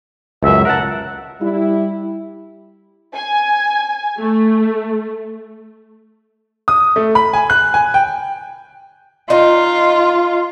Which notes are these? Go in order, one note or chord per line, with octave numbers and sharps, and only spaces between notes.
C#2 F#2 E5
A#4 F#5 A5
G3 E4
G#5
A3
D#6
A3
B5
G#5
F#6
G#5
G5
D#4 F4 F5